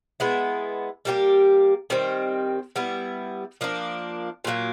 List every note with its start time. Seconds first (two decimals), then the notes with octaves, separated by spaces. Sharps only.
0.20 G#3 B3 E4
1.05 G3 A#3 D#4 G4
1.90 D#3 G3 C4
2.76 G3 B3 E4
3.61 F3 A#3 D4
4.45 A#2 F#3 A#3